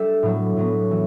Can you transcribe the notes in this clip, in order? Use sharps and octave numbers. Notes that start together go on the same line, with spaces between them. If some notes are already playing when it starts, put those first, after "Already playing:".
Already playing: G3 D4 A4 E5
A2 F#3 B3
A2 F#3 B3
E3